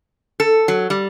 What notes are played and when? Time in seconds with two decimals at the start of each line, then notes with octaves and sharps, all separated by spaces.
0.40 A4
0.68 F#3
0.90 G3